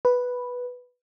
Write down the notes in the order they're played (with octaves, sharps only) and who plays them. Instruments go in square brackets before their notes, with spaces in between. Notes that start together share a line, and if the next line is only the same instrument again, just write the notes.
[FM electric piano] B4